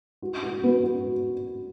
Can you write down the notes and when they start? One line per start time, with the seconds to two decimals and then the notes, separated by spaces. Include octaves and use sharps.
0.22 F#4
0.43 F#4
0.63 B3
0.84 F#4